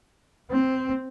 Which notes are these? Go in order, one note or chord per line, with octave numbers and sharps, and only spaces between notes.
C4